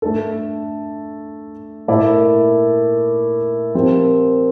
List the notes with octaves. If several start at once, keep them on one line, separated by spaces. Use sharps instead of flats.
A3 D4 A4
A#2 A3 E4 A#4 D5
F3 C4 G4 A#4